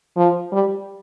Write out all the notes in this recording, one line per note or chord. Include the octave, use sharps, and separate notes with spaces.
F3
G3